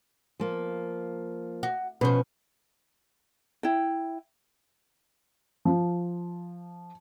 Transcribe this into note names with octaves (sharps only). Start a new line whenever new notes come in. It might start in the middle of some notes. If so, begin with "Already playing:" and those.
F3 A#3
F#4
B2 F3 C#4 B4 C5
E4 G5
F3